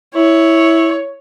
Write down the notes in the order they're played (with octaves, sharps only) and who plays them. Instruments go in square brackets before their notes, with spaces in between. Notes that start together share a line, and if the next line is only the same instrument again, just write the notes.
[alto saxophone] E4 [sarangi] C#5